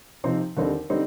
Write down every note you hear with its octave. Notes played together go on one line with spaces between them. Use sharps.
C3 F3 C4 D#4
D#2 D3 G3 C4 D#4
D3 G3 C4 D#4